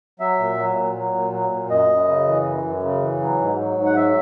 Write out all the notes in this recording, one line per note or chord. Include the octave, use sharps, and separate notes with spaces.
F#3 E5
A#2
F#3
A#2
F#3
A#2
F#3
A#2
F#2 D#5
F#2
C#3
E3
F#2
F#2
C#3
E3
F#3
G#2
F#3
G#2
F#5
F#3 E5